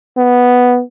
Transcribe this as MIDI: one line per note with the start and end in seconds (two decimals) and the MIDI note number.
0.17 0.81 59